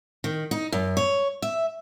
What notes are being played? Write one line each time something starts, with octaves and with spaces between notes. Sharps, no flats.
D#3
D#4
F#2
C#5
E5